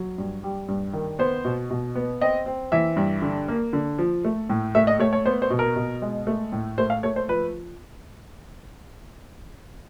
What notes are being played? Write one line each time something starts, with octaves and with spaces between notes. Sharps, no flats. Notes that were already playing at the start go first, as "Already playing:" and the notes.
Already playing: F#3
G2
G3
G2
D#3
B3 C5
B2
B2
B3
C4 D#5
C4
E3 E5
G2
D3
A#3
D3
F3
A3
A2
A3 E5
D#5
A3 C#5
C#5
B3 C5
C5
B2
A#4
B2
G#3
A3
A2
A3 C5
F5
A3 C#5
C5
F3 B4